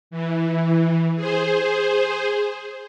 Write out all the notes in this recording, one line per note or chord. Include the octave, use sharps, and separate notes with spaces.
E3
G#4 C5